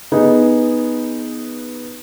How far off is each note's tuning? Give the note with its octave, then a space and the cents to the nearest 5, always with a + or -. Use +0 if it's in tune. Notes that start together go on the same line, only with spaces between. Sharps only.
B3 -5 D#4 +0 G#4 +0